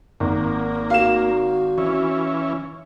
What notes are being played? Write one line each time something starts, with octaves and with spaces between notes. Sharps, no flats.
G#1 A#3
F#4 F5 E7
E3 C#4